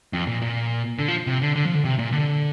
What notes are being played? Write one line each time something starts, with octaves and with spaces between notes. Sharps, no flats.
F2
A#2
A#2
D3
F3
C3
D3
D3
F3
D3
C3
A#2
D3